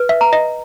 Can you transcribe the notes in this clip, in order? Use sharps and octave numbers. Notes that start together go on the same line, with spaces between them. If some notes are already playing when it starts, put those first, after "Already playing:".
Already playing: B4
E5
A#5
D#5